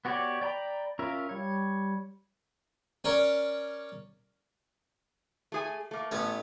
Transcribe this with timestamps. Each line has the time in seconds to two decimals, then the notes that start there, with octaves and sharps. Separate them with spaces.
0.05 B3 F#4 G4 C#5 D5
0.41 D5 G5 A#5 B5
0.99 C#4 F4 A#4 E5 F5
1.29 G3 C#5
3.04 C#4 A#4 C#5 D5
5.52 A3 G#4 G#5
5.91 A3 A#3
6.11 A1 A3 B3 C#4 C#5